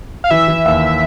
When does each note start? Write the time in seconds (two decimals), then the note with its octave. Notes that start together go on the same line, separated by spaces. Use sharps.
0.24 F5
0.31 E3 E5
0.48 E3
0.65 D#2